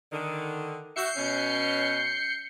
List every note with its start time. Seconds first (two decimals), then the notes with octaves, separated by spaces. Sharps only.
0.12 D3 D#3
0.96 F#4 E5 G6 C7 C#7
1.17 B2 C#4